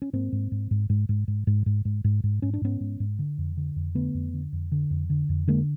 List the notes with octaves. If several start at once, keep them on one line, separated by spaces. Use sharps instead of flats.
C#4
G#2 A#3 C4
G#2
G#2
G#2
G#2
G#2
G#2
G#2
G#2
G#2
G#2
G#2
G#2 C#4
D4
G#2 B3 C#4
G#2
G#2
D3
F2
D3
F2
D3 A3 B3
F2
D3
F2
D3
F2
D3
F2
D3 G#3 A#3